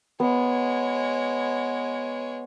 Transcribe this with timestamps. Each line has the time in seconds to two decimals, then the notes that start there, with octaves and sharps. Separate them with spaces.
0.20 G#3 B3 C#5